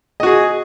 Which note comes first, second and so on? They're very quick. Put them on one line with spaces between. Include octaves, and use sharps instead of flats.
D#5 F#4 G#4